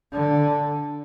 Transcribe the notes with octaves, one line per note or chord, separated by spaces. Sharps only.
D3